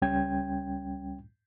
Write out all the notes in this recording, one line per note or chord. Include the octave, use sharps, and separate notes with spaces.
C#2 G3 C#4 G5 G#6